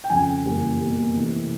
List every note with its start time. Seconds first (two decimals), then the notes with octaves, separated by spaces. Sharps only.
0.04 G5
0.10 F2 C#3 F3 G#5
0.45 F#2 C#3 E3 G3 A#3
0.80 B2 G3 A#3
1.15 C3 E3 A3